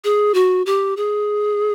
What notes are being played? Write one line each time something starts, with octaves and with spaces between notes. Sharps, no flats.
G#4
F#4
G4
G#4